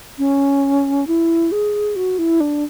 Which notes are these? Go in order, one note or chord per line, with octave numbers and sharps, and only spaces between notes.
C#4
E4
G#4
F#4
E4
D4